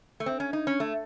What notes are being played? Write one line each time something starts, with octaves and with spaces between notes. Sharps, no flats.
A3
C4
C#4
D#4
C#4
A3